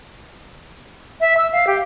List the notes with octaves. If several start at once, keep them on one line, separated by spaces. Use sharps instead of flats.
E5
E6
F5
G4